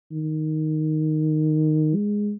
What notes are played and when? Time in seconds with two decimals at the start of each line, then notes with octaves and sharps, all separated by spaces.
0.11 D#3
1.95 G#3